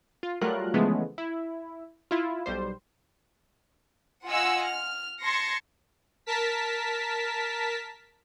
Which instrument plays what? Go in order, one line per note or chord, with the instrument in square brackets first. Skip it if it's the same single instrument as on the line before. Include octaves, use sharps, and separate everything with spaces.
[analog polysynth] F4
F#3 G3 A3 F4 A#4 F#6
C#3 E3 F3 G#3 A3 B3
E4
E4 F4
B1 G3 C5
[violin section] F4 D#5 F#5 G#5 E6
F6
A5 C6 G#6 A#6 C#7
[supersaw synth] A#4 A5 B6